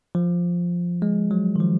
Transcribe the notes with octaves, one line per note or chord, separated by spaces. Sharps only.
F3
G#3
F#3
D#3
F3